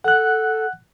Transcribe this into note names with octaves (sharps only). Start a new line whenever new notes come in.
A4 F#5 F#6